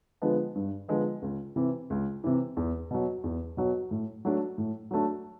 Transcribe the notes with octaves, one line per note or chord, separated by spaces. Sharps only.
D3 F3 G#3 B3
G2
D3 F3 G#3 B3
C#2
C3 E3
C#2
C3 E3
E2
B2 F#3
E2
B2 F#3
A2
F#3 A3 D4
A2
F#3 A3 D4